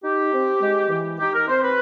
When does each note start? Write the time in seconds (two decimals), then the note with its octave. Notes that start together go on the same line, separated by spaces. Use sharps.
0.03 D#4 G4
0.33 C4
0.61 G#3
0.90 E3
1.19 D#4 G4
1.33 A#4
1.48 C4 C5
1.62 B4